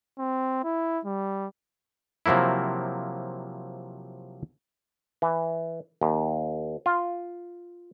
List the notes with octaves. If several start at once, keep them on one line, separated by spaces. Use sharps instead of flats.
C4
E4
G3
C3 F3 F#3 A#3 E4
E3
D#2
F4